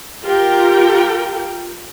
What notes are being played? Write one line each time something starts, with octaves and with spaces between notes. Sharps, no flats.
F4 G4 A#4 G5